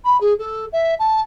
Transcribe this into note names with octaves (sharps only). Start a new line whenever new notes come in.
B5
G#4
A4
E5
A5